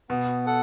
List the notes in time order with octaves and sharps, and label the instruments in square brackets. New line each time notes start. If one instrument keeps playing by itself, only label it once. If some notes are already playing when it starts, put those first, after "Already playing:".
[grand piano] B2 [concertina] B3
[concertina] A4 F#5